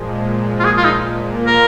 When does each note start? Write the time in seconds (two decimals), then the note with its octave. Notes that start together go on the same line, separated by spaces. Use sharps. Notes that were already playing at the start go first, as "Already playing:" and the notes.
Already playing: A#2 F3 G#3
0.60 F4
0.64 G#4
0.77 F4
0.85 D#4
1.05 A#2 A#3 F4
1.47 A#4